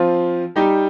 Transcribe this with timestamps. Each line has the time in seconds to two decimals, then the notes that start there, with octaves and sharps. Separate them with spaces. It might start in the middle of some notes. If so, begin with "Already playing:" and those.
Already playing: F3 C4 F4
0.56 G3 D#4 G4